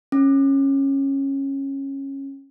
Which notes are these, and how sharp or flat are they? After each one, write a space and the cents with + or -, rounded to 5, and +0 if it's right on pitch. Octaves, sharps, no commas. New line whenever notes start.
C#4 -15